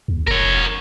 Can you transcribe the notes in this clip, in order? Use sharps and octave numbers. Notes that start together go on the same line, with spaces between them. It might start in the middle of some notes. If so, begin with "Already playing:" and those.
D#2
F1 A#4 C#5